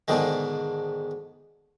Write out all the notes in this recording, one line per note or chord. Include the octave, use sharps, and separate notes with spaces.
G#2 B2 D3 D#3 G#3